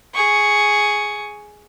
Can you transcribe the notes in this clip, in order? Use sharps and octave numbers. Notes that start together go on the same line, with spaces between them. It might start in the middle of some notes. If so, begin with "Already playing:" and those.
G#4 C#6